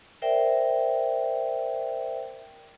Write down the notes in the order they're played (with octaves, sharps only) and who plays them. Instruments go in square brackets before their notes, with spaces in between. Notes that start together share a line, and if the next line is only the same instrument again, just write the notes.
[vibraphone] A#4 C5 D5 E5 G5